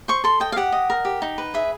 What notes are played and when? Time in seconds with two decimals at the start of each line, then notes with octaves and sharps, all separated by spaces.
0.08 C5 C#6
0.24 A4 C6
0.40 D#5 G5
0.52 F5
0.56 G4 F#5
0.72 D#5
0.90 A#4
1.05 G4
1.22 D#4
1.38 B4
1.54 G#4 E5